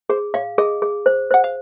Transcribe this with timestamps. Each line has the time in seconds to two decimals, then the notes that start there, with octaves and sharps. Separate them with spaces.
0.10 G#4 C5
0.34 C#5 F5
0.58 G#4 D#5
0.82 G#4
1.06 C5
1.31 C5 F#5
1.44 F5